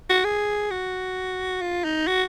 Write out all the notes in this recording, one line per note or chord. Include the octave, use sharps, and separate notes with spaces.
F#4
G#4
F#4
F4
D#4
F#4